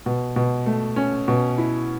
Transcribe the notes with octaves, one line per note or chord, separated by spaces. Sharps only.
B2
B2
A3
C#4
B2
E4